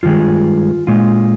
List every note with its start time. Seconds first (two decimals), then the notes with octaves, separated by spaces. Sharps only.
0.03 G2 D#3 G#3 F4
0.87 A#2 G#3 F4